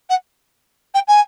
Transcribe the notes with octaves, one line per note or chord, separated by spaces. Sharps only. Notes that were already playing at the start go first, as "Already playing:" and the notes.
F#5
G5
G#5